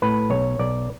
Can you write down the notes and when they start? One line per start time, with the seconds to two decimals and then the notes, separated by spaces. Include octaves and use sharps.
0.02 A2 B4
0.30 B1 C#5
0.59 B1 D5